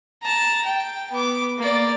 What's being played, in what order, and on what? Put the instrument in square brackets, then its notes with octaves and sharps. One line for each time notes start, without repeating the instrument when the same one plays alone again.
[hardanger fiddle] A5 A#5
G5
B3 D6
A#3 D5